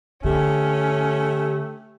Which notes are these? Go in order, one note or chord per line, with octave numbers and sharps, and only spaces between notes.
D3 A3 C#4 G4